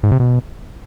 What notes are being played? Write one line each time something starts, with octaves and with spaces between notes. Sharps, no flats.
G#2
C3
B2